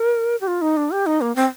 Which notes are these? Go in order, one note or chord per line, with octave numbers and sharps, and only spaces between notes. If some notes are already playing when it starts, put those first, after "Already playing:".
Already playing: A#4
G4
F4
D#4
D4
G4
D#4
A#3
C4